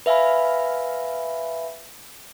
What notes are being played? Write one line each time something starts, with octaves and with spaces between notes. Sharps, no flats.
B4 E5 F5 G#5 B5